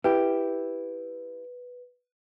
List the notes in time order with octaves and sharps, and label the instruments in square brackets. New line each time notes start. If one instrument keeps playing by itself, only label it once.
[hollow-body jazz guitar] E4 G4 [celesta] B4